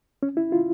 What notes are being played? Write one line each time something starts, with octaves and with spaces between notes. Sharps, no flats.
C#4
E4
F4